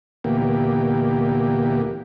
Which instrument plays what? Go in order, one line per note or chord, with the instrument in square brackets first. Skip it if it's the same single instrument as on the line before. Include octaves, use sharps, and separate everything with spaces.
[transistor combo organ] D2 A#2 E3 A#3 B3 G4